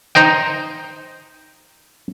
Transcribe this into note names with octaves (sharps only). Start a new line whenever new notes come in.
D#4 C5 D#5 G5